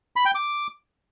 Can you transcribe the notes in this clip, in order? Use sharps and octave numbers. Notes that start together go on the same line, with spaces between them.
B5
G5
D6